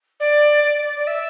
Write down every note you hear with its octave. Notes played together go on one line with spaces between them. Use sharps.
D5
D5
D5
E5